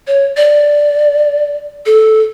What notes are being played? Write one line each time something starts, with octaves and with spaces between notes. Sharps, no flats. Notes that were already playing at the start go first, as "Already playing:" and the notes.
C#5
D5
A4